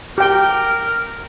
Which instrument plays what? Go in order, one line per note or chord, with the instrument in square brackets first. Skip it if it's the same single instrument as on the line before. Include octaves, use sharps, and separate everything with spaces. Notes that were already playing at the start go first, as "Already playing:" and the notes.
[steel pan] G4 G5 [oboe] A#4